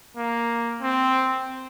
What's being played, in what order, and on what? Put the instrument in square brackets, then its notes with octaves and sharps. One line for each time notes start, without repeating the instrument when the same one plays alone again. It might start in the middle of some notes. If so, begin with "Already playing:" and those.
[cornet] A#3
C4